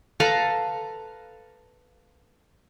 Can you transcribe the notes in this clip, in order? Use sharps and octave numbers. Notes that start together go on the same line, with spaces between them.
A4 B4 F5 A#5